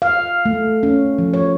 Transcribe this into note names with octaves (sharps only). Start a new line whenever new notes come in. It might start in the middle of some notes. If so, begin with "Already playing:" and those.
F5
A3
C#4
F3
C#5